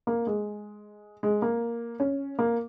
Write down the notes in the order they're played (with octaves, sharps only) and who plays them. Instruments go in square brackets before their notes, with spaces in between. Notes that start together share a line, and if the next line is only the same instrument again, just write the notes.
[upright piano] A#3
G#3
G#3
A#3
C#4
A#3